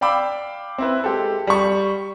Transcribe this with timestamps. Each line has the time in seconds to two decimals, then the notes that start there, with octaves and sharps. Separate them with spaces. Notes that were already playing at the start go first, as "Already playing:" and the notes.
0.01 D5 F5 G5 B5 D6 E6
0.78 C4 E4 B4
1.04 G#3 G4 A4
1.47 G3 C#6